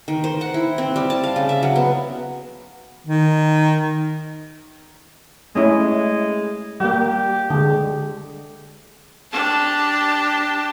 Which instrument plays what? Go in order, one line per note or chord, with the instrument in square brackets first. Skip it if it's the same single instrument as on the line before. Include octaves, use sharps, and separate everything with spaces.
[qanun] D#3
C5
F#5
E4
C4
G3
A5
F5
C#3
E5
F#3
B3
[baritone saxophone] D#3
[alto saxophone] G#3 [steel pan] A3 C#4 E4
[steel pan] G3 A#3 [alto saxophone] G4
[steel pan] D3 G#3
[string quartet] D4 G4 A5